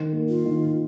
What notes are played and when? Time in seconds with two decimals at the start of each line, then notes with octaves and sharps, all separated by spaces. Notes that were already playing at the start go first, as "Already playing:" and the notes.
Already playing: D#3
0.13 A#3
0.29 F4
0.45 D#3